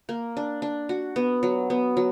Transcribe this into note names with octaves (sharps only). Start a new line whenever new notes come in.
A#3
D4
D4
F#4
B3
F#3
B3
F#3